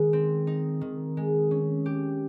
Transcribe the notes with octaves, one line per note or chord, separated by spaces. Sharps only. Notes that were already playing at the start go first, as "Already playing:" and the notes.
Already playing: D#3 G#3
C4
D#4
D#3
G#3
C#4
G4